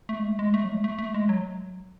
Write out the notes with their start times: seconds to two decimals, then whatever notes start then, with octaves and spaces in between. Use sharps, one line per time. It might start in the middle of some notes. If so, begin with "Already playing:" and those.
0.09 A3
0.19 G#3
0.28 A3
0.39 G#3
0.54 A3
0.64 F#3
0.68 G#3
0.84 A3
0.99 A3
1.14 G#3
1.29 F#3